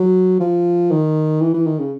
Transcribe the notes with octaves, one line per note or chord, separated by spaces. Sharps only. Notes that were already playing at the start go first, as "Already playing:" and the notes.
Already playing: F#3
F3
D#3
E3
E3
D#3
C#3